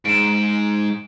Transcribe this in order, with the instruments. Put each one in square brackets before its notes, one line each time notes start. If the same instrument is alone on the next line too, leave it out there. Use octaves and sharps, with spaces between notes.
[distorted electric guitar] G#2 [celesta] D7 E7